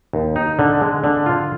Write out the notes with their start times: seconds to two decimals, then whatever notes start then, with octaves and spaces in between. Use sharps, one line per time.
0.13 D#2
0.36 D#4
0.59 D3
0.81 G#3
1.04 D3
1.26 F4